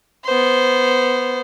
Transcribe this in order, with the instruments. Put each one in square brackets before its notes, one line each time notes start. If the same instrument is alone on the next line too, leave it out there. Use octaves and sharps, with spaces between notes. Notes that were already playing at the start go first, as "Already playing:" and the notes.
[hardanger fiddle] B3 C5